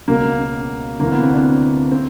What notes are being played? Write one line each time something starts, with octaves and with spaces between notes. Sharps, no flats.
C#2 B2 A#3
D2 C3 E3 A#3
B3
C4
D4
C4